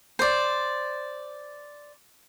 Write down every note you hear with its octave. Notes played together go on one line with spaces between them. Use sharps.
C5 D5